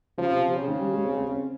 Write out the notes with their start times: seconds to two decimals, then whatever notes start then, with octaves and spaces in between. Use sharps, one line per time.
0.18 C#3 F3
0.30 C3
0.43 C3
0.55 C#3
0.68 D#3
0.80 G3
0.93 G#3
1.04 C4
1.17 C4
1.29 C#4